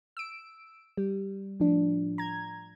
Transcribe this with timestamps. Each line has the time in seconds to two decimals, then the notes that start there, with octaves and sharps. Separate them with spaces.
0.17 E6 D7
0.97 G3
1.60 A2 F3 D4
2.18 A#5 G#6